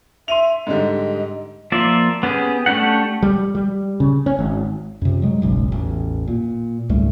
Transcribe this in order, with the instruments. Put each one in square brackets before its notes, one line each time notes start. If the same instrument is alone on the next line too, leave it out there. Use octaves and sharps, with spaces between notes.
[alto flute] E5 [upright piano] C6 D#7 F7
[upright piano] G#2 D3 G3 [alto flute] D#5
[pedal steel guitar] F3 A#3 F4 D5 E5
B3 C#4 G4 G#4
A3 C#4 D4 G4 F#5
[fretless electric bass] G3
G3
C#3
C#4
G#1
[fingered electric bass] F#2 C3
F#3 G#3
F#1 B1 G#2
A1 E2
A#2
C#2 G#2 G3 A3